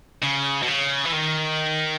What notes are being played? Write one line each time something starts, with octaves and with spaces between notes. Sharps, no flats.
C#3
B2
C#3
E3
D#3